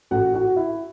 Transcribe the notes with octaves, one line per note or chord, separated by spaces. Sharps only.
A1 A2 A3 F#4 F#5
F#4 F#5
E4 E5